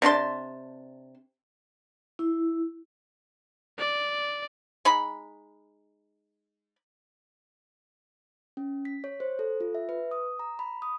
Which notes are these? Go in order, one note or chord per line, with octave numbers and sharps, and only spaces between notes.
C3 D4 A5 C6
E4
D5
G#3 D#4 B5
C#4
B6
C#5
C5
A4
F4
E5
B4
D#6
A#5
B5
D#6